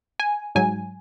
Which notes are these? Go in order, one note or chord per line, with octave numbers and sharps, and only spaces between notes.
G#5
G#2 F#3 G#5